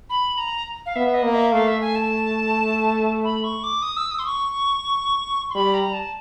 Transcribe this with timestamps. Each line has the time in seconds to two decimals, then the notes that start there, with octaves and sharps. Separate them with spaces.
0.10 B5
0.37 A#5
0.86 F5
0.96 B3 E5
1.14 D#5
1.24 A#3
1.34 E5
1.53 A3 F5
1.68 E5
1.81 G#5
1.95 A5
3.24 B5
3.44 C#6
3.63 D6
3.82 D#6
3.97 E6
4.11 D#6
4.19 C6
4.25 C#6
5.50 C6
5.54 G3 B5
5.74 A#5
5.93 A5